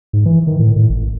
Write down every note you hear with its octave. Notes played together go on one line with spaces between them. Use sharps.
G#2
E3
D#3
A2
A2
G#1